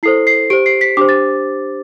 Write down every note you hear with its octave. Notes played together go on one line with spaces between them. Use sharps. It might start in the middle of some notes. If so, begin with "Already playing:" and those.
E4 A4 C5 C7
C7
G4 C5 D7
C7
B6
D4 G4 C5 D6
A6